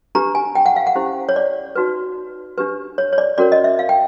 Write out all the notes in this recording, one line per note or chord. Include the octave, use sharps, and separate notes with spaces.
D4 G4 B4 A#5
G#5
G5
F#5
F5
F#5
C#4 E4 G4 C5
C#5
D5
D#4 F#4 B4
D4 G4 B4
C#5
C#5
D5
C#4 F#4 A#4 C#5 D5
D#5
E5
F5
G5